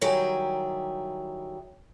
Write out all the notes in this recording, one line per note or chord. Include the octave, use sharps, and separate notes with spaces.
D#3 F#3 G3 E4 G4 G#4